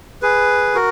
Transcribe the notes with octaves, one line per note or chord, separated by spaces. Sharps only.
G#4 B4
F#4 A#4